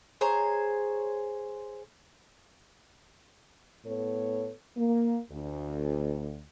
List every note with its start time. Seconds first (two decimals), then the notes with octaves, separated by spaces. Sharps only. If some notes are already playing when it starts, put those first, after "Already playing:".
0.21 G#4 C5 C#5 A#5
3.85 A2 B3 A4 C#5
4.76 A#3
5.30 D2